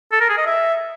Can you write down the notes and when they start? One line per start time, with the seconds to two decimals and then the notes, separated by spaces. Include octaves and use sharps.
0.12 A4
0.20 A#4
0.29 G#4
0.37 D#5
0.46 E5